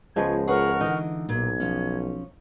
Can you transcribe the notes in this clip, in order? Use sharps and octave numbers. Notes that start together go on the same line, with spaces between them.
C#2 F3 G#3 B3 C#6 G#6
G#4 A#4 B4 C#5 F#5 C#6
D3 E3 D#4
B1 A#2 G#6
F3 C#4